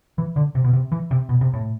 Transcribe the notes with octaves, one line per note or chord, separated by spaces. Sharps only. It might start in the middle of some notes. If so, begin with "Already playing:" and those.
E3
D3
C3
B2
C3
E3
C3
B2
C3
A2